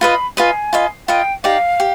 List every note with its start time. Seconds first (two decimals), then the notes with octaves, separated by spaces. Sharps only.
0.01 F4 B4 D#5 B5
0.37 F4 B4 D#5 G#5
0.73 F4 B4 D#5
1.08 F4 B4 D#5 G5
1.44 D#4 G4 D5 F5
1.80 G4